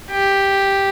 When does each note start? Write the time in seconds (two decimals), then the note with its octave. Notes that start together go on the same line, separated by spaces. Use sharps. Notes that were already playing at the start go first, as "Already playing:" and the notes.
0.11 G4